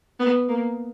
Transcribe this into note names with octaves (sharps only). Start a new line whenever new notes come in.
B3
A#3